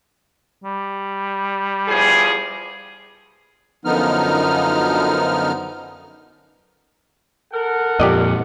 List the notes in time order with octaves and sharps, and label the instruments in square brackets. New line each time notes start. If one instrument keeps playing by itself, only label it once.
[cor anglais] G3
[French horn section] E2 F3 G#4
[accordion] F#2 D3 F3 B3 D#4 F6
[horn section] A4 A#4 F#5
[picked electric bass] F2 A#2 [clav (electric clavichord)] G4 D5 D#5